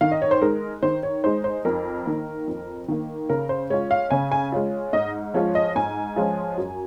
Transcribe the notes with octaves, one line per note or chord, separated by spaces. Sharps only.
D#3 F5
D#5
C#5
C5
G#3 D#4 A#4
D#3 C5
C#5
G#3 D#4 C5
C5
F2 A#4
D#3 A#3
F2
D#3 A#3
C#3 A#4
C5
G#3 C#4 F4 C#5
F5
C#3 G#5
G#5
G#3 C#4 F4
G#2 D#5
F3 G#3 C#4 F4 C#5
D#5
G#2 G#5
F3 G#3 C#4 F4
F#2